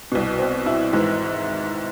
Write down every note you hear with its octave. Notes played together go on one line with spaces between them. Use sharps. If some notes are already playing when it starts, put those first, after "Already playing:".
C2 B2
C4
E4
G#1 G#2 E3